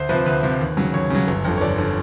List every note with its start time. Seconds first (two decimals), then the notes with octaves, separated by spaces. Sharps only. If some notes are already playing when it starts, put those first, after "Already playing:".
Already playing: D2 C5
0.09 C3 F3 B4
0.26 D2 B4
0.43 C3 F3
0.60 D#2
0.77 C#3 F#3
0.94 D#2 C#5
1.10 C#3 F#3
1.28 G1
1.45 F2 D3
1.57 C#5
1.61 G1 D5
1.78 D3